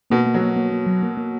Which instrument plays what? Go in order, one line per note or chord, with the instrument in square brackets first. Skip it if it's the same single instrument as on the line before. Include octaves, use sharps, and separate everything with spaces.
[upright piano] B2 [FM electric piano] A#3
[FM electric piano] A#3
[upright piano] F#3
[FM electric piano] A#3
A#3
A#3
F#3
A#3
A#3